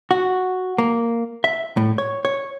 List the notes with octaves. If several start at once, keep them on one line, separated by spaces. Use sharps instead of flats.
F#4
A#3
E5
A2
C#5
C#5